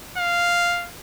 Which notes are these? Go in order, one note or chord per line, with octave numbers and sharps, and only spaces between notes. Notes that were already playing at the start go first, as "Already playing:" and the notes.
F5